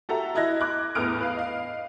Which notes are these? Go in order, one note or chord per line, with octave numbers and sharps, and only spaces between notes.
F#4 G4 A4 E5 A#5
E4 D#5 F#6 G#6 A#6
D6 F#6 G#6
E2 A2 B3 D#6 F6 D7
B4 F5
D#5 F5